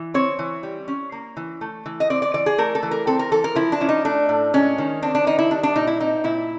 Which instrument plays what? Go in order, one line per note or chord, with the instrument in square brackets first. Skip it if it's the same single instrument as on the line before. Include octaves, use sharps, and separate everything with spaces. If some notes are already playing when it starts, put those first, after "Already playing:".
Already playing: [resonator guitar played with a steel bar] E3
C4 C#5
E3
G3
C#4
A#3
E3
A3
E3
D#5
C4 D5
D5
E3 D5
G#4
A3 A#4
A4
E3
A#4
C4 A4
A#4
E3 A4
A#4
F3 E4
D4
C#4 E4
D#4
A3 D4
A2
G#3 C#4
D#3
C4 D4
D4
D#3 D#4
E4
G3 D4
D4
A#2 D#4
E4
C4 D#4
A#2 E4